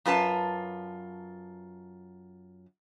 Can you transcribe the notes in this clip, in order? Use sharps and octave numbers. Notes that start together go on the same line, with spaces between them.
F#2 F4 B4 A5